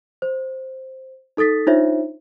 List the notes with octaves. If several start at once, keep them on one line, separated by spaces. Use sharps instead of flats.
C5
D#4 A4 D#6 A6 B6
D4 D#4 F4 C5 C#5 E5